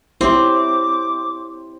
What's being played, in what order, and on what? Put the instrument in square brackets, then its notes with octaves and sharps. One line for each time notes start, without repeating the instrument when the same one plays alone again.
[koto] C4 [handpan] E4 G4 C#5 [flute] D6